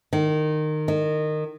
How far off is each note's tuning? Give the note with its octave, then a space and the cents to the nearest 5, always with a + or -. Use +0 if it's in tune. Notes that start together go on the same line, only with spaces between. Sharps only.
D#3 -20
D#3 -20